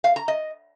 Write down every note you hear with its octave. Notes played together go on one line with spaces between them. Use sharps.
F5
A#5
D#5